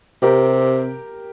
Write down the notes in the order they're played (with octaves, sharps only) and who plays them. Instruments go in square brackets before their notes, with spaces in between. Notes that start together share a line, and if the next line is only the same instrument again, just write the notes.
[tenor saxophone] C3 [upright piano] G4 A#4